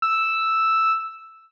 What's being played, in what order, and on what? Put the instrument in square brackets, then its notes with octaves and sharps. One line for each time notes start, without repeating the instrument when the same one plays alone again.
[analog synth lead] E6